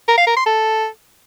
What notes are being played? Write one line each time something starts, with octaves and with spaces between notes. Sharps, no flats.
A#4
F5
A#4
C6
A4